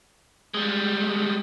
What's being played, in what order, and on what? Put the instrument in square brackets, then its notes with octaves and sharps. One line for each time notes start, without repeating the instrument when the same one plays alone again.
[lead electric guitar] G3 G#3